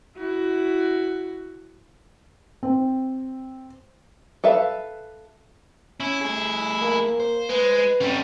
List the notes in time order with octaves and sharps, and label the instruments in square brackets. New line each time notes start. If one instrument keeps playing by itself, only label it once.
[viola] E4 F#4
[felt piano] C4
[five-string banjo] A4 B4 E5 F5
[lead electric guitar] C#4 [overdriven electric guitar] E4
[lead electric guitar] A3 G#4
[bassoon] A#3
[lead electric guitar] C5
[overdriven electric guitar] G#3 [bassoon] B4
[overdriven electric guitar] D3 G3 [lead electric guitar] C4 C#4